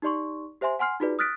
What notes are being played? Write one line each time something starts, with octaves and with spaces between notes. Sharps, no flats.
D#4 G4 D5 C6 C#6
G4 C5 E5 G#5 C6
F#5 G#5 C6 F6 C7
D#4 F4 F#4 G#4 B4 D5
D#6 F6 F#6 A6 B6 D7